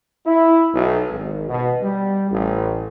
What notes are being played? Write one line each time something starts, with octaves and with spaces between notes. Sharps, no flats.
E4
B1
G#1
B2
G3
A1